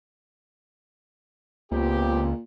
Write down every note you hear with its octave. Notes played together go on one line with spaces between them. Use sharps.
C#2 A#2 B3 C4 G4